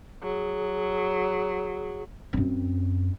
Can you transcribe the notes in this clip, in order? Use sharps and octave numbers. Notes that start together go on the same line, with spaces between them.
F#3 G#4
F#2 C4